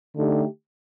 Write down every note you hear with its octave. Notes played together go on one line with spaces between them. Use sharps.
D3 A3 D#4 G4